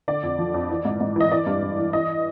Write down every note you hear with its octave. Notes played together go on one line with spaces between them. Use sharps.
D3 D5
F2
F3
F2
E3
G#2
G#2
E3 D#5
E3 D5
G2
G2
E3
E3 D#5